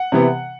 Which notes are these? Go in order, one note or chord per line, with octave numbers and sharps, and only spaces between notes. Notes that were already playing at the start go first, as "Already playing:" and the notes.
Already playing: F#5
C3 E3 B3